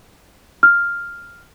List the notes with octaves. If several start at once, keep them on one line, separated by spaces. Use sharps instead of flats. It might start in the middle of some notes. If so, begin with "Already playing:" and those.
F6